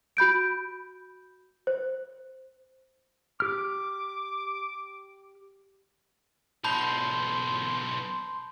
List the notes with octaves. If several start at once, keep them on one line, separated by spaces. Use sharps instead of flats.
F#4 B5 G6 D7
C5
G4 D6 F6
B1 E2 A5 B5 C6 G6